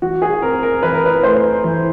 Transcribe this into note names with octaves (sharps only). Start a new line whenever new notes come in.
E3 F#4
G#4
C4 A#4
A#4
E3 B4
A#4
B4
A3 C5
E3